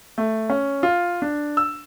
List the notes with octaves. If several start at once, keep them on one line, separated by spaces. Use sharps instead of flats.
A3
C#4
F4
D4
E6